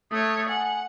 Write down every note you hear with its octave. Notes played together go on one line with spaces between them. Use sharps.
A3 C#5 D#6
F#5 G#5